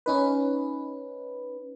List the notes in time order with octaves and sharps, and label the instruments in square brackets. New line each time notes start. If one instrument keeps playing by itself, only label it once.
[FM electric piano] C#4 D#4 B4